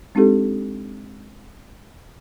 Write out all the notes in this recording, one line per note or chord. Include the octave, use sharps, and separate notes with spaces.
G#3 C4 D4 D#4 G4 A4